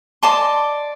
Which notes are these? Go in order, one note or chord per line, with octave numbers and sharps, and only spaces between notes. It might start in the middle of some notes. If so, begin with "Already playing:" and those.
D5 D#5 A5 C6